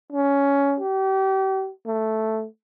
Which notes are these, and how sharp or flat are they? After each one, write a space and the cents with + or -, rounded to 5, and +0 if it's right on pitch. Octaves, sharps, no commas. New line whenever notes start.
C#4 +15
G4 -35
A3 +0